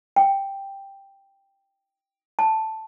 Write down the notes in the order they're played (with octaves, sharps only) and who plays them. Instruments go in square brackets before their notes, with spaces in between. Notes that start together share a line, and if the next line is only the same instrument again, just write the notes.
[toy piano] G5
A5